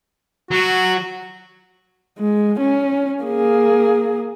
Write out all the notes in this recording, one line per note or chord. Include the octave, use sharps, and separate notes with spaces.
F#3 F#4
G#3
C#4
A#3 G#4